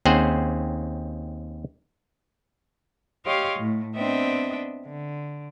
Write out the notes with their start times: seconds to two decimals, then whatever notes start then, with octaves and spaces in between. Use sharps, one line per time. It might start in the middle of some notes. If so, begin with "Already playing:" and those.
0.05 D#2 C4 C#4 G#4 C5 F#5
3.26 G4 C#5 D#5 F5 C6
3.58 A2
3.95 B3 C4 D4 D#5 E5 G5
4.85 D3